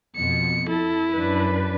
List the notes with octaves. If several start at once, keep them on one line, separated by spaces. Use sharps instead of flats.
F2 B2 C#7
E4 A4
F#2 D4 B4